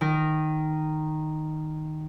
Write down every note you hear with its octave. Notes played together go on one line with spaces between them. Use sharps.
D#3 A#4